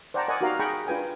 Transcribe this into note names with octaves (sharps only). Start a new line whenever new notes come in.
C5 D5 F#5 G5 A5 A#5
A#4 D5 D#5 F#5 G#5
D#4 F#4 G4 A#4 F5 A#5
G#4 G5 A#5 B5 C#6
D4 F4 B4 G5 G#5